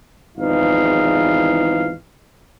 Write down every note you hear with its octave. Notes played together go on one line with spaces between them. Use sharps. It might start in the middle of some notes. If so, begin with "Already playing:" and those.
G#1 E2 E3 F3 D#4 F5